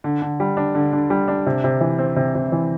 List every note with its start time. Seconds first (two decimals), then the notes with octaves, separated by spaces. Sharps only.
0.04 D3
0.22 D3
0.40 G3
0.57 D4
0.75 D3
0.93 D3
1.10 G3
1.28 D4
1.46 C3
1.64 C3
1.81 E3
1.99 C4
2.16 C3
2.35 C3
2.52 E3